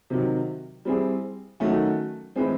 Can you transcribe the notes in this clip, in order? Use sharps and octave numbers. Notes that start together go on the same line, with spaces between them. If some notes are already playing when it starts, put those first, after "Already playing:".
C3 D#3 F#3
G3 C4 E4 G#4
D#3 F#3 A3 C#4 F#4
A2 E3 G#3 C4